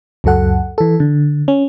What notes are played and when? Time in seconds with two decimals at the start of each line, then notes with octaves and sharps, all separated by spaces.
0.24 C#2 F#2 F#3 A4 F#5
0.78 E3 A4
1.00 D3
1.48 C#4